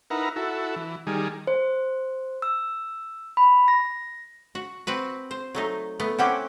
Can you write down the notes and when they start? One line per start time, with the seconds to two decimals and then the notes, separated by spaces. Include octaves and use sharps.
0.10 D#4 E4 A#4 B4 F#5 A#5
0.36 E4 F#4 A4
0.76 E3
1.07 D#3 G3 G#4
1.47 C5
2.42 E6
3.37 B5
3.68 A#6
4.55 F#4
4.87 C4 F#4 B4
5.31 C5
5.55 F#3 A3 D#4
6.00 A3 B3 D#6
6.18 C4 C#4 E4 F#5 G5 D6